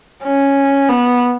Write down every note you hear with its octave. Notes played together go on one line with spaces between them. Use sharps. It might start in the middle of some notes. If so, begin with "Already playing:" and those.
C#4
B3